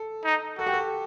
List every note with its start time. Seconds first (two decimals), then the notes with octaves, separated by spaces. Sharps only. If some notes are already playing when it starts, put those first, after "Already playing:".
Already playing: A4
0.25 D#4
0.58 F#4 A4
0.66 G4
0.74 A4